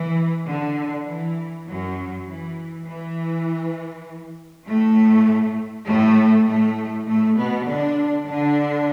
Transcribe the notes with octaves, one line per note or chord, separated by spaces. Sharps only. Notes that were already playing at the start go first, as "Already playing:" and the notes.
Already playing: E3
D3
E3
F#2 F#3
E3
E3
A2 A3
A2 A3
A2 A3
A2 A3
B2 B3
D3 D4
D3 D4